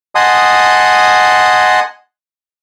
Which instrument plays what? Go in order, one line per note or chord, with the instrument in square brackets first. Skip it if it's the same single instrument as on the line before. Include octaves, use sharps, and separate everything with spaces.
[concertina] D#5 F#5 G#5 A5 C6 D#6